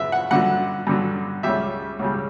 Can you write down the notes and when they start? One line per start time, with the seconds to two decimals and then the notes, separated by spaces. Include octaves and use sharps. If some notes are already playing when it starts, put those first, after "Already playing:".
Already playing: F#2 C#3 F#3 B3 E5
0.12 F#5
0.31 G2 D3 F#3 F#5
0.87 G2 D3 F#3
1.43 C#2 C#3 G3 E5
1.99 C#2 C#3 G3